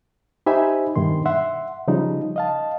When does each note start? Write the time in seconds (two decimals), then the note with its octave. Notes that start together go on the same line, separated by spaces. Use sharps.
0.46 D#4 G4 C5 E5 G#5 B5
0.96 G2 B2 D#3 C6
1.26 E5 F#5 C6
1.88 C#3 F3 G3 D#4
2.36 D#5 F5 A5